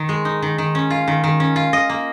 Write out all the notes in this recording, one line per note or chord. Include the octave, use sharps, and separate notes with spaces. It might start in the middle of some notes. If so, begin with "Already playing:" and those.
Already playing: D#3
G#3
D#4
D#3
D#3
C#4
F4
D#3
D#3
C#4
F4
D#5
A#3